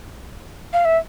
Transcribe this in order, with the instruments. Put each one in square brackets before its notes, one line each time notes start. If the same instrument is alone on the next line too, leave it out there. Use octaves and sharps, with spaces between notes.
[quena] F5
E5